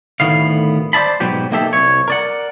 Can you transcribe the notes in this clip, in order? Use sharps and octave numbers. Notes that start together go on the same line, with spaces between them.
D2 A2 D#3 B3 F5
C5 D5 E5 A5 B5
G#2 B2 F#3 G4 B4
B1 A#3 D#4 G4 A4 E5
C2 C#5
A#4 D5 F#5